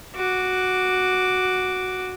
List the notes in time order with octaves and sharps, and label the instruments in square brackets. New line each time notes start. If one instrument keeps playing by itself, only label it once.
[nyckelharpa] F#4 D6